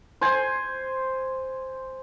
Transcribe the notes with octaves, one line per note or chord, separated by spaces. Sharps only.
C5 G#5